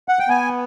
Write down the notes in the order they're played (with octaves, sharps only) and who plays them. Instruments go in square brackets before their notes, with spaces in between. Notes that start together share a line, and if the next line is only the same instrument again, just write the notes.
[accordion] F#5
G5
B3 G#5